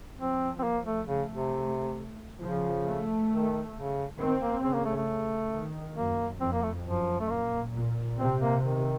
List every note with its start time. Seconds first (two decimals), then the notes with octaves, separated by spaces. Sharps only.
0.19 F3 C4
0.59 C4
0.63 A#3
0.85 A3
1.08 C#3 A3
1.31 C3
2.41 C#3 F3
2.86 A3
3.30 D#3
3.75 C#3
4.19 D#3 C4
4.40 A#3
4.63 C#3 C4
4.74 A#3
4.86 A3
4.96 A3
5.52 D#3
5.96 F#2 A#3
6.41 F2 C4
6.53 A#3
6.62 A3
6.85 F#2 F3
7.20 A3
7.30 A#2 A#3
7.74 A#2
8.18 C3 C4
8.40 A#3
8.63 D#3